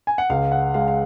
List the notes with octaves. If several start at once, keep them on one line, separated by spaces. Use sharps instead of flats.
G#5
F#5
C#2 F5
F#5
G#3 F5
F5